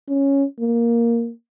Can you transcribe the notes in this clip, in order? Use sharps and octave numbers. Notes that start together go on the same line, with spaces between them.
C#4
A#3